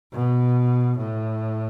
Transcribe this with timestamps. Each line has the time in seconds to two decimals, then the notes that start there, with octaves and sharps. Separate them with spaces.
0.13 B2
0.98 A2